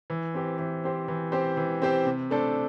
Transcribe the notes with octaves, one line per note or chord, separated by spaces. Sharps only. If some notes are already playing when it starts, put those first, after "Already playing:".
E3
C4 G4 C5
E3
C4 G4 C5
E3
C4 G4 C5
E3
C4 G4 C5
C3
A3 D4 A4 C5